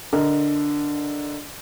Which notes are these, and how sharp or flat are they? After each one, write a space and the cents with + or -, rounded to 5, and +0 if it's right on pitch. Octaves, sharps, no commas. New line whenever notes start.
D3 +0 A#4 +5 D#5 +10